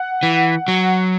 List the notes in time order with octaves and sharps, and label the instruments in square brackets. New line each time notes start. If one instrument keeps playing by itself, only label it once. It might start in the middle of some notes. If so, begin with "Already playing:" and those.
Already playing: [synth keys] F#5
[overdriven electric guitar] E3
F#3